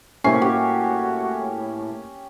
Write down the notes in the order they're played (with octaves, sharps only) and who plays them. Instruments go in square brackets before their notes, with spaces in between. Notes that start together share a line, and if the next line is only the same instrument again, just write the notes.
[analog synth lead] A2 [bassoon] C3 [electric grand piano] A#3 G#5 C7 [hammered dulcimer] C#4
[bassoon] F#4 [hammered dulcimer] G4